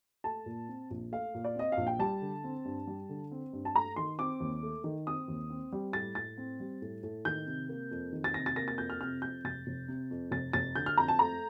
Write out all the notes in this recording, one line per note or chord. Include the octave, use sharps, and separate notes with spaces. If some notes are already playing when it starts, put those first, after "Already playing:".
A3 A5
A#2
C4
A#1
A3 F5
A#2
D5
C4 D#5
F5
A#1
G5
G3 A5
D3
C4
G2
G3
D3
C4
G2
A5
A3 A#5
D#3 C6
C4 D6
D#2
A3
D#3
C4 D#6
D#2
C4
G3
A2 A6
A2 A6
C4
G3
A2
A2
D#3 G6
C3
A#3
F2
D#3
A6
C3 A#6
A6
A#3 A#6
A6
F2 G6
F6
C3 F6
F2 G6
F1 A6
F1
C3
F2
F1 A6
F1 A6
D3 G6
F6
F2 A#5
A5
A3 A#5